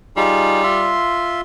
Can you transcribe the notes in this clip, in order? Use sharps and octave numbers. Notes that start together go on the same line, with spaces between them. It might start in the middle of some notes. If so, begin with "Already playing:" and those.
G3 D#4 F4 G#4
F4 E5 C6